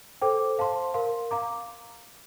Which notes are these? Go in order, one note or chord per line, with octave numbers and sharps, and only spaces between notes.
A4 C5 G5 D6
C5 F5 A5 C6
A#4 F5 C6
F5 A#5 D6